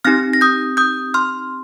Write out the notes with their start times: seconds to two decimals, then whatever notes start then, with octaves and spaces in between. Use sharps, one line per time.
0.05 C4 D#4 G4 F6 A#6
0.33 A#6
0.41 D#6 G6
0.77 D#6 G6
1.14 C6 F6